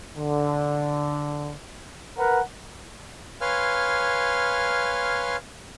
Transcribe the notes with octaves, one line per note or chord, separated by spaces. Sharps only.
D3
A#4 B4 F#5
B4 C#5 F5 G#5 C6 F6